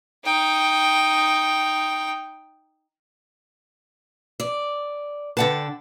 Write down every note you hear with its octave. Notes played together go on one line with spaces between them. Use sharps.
D#4 G5
D5
D3 B4 D5 F#5 G5 A5